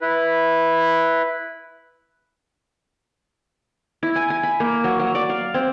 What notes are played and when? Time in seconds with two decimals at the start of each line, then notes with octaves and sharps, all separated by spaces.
0.01 E4 B4
4.03 E4
4.16 G#5
4.30 G#5
4.43 B5
4.60 A#3
4.84 F#3
4.99 F#3
5.15 D5
5.30 F5
5.54 C4